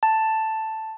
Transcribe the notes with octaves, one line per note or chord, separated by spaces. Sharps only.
A5